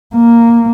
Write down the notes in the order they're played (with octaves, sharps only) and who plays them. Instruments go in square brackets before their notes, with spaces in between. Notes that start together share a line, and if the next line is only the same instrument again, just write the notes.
[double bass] A#3